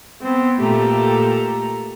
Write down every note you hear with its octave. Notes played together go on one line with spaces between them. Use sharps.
B3 C4
A#2 A3 G4 A4 A#5